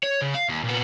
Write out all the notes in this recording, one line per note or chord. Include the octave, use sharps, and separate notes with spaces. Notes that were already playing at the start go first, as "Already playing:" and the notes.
C#5
C#3
F5
D#2
A#2 B3